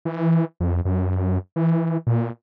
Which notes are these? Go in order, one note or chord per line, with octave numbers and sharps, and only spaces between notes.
E3
F2
F#2
E3
A#2